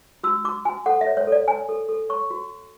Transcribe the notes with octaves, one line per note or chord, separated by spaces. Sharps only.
F#4 E6
F#4 D6
F#4 G#5
A4 F#5
E5
C#5
C#5
A4 D5
C#5 G#5
A4
A4
C#5 C#6
F#4